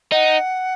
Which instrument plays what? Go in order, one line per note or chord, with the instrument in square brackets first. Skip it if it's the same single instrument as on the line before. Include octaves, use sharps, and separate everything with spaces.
[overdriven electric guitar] D#4 [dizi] F#5